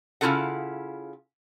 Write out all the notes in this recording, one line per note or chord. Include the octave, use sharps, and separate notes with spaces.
C#3 C4 E4 F4 A4 F#5